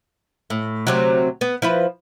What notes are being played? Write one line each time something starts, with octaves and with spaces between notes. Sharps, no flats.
A2
D2 C3 F#3
B3
F3 E4 B4